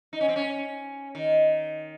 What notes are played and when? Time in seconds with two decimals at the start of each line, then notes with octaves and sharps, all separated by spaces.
0.13 D#4
0.21 C#4
0.28 C4
0.36 C#4
1.15 D#3